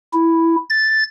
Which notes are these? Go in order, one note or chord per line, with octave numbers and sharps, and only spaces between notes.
E4
A6